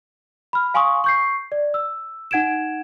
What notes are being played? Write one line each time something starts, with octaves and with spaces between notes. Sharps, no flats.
B5 F6
F5 G#5 C6 C#6 D#6
C#6 G6 C7
D5
E6
D#4 F#5 G#6 D7 E7